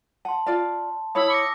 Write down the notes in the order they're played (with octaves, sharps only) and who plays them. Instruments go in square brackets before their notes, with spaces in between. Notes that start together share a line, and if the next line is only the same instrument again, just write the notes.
[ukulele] F#5 [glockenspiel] A5 C6
[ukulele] F4 D5 F5
[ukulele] E4 C#5 F5 [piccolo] B5 [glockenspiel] D#6 E6
[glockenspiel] D6 A#6 [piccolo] C#7